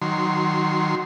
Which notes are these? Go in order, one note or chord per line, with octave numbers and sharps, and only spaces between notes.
D#3 F#3 C6